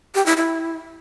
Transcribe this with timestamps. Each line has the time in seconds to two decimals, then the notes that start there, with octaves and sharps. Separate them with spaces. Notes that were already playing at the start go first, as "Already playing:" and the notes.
0.15 G4
0.26 E4
0.37 E4